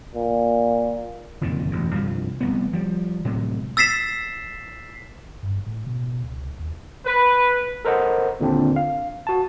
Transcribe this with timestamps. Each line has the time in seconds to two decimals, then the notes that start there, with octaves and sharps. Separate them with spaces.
0.15 A#2
1.41 F#1 F2 A#2 D#3
1.71 E1 A1 F#2
1.94 C2 G2 F3
2.41 F1 C2 B3
2.73 F3 G3
3.25 A2 C3 F#3 G#3
3.77 E6 A6 B6 C7 E7
5.26 G1
5.43 G2
5.66 A2
5.87 B2
6.24 C#2
6.59 D#2
7.06 B4
7.85 A4 A#4 C5 D#5 F#5
8.40 D#2 A#2 D3 C4 D4
8.76 F5
9.27 F#4 A5